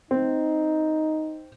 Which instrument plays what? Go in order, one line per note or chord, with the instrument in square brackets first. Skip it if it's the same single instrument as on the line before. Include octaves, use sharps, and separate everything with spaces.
[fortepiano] C4 [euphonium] D#4